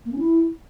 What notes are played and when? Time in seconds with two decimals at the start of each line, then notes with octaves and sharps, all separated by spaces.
0.06 A#3
0.12 C#4
0.19 E4